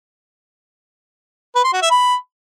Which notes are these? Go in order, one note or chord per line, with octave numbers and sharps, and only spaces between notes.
B4
C6
F#4
E5
B5